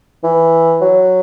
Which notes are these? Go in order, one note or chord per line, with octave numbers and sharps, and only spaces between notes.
E3
F#3